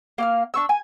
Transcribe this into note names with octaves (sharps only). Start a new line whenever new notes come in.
A#3 F5 F6
D4 C#6 E6
G#5